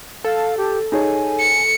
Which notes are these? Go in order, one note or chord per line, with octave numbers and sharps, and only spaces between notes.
A4 F5
G4
D#4 G#4 C#5 G#5
C#7